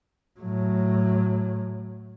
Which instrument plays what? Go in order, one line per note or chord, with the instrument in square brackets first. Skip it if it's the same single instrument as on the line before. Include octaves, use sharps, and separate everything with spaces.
[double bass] A2 F#3